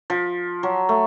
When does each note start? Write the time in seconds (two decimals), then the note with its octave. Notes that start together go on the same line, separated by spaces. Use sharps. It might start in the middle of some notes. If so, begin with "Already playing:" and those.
0.10 F3
0.63 F#3
0.89 A3